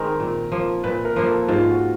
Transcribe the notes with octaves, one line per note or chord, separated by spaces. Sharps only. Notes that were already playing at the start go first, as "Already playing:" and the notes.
Already playing: D#3 G#3 C4 A#4
A#2
F3 A#3
A#2 B4
A#4
F3 A#3
A4
G#2 F4
F#4